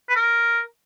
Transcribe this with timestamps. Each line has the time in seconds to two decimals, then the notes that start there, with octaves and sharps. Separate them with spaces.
0.09 B4
0.16 A#4